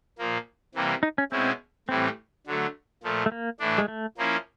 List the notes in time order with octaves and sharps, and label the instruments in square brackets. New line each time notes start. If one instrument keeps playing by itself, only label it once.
[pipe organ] A#2 F3 A#3
C3 E3 G3 A#3
[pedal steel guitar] D#4
C#4
[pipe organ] B2 G#3 C#4 E4 [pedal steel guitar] C4
[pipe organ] A2 E3 G3 [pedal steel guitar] C4
[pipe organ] D3 F#3 A3
A#2 F3 A3
[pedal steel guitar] A3
A#3
[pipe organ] A2 E3 A3 D4
[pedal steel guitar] G#3
A3
[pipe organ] F3 A#3 C#4 E4